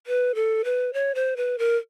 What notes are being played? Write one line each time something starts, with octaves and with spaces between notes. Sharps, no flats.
B4
A4
B4
C#5
C5
B4
A#4